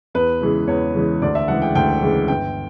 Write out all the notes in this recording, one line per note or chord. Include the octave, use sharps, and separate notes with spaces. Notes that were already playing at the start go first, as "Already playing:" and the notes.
E2 B4
C#3 E3 G#3
E2 C#5
C#3 E3 G#3
D2 D5
E5
C#3 E3 G#3 F#5
G5
D2 G5
C#3 E3 G#3
G1 G5